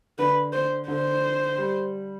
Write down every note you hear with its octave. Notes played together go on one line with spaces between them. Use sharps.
D3 B4
C5
D3 C5
G3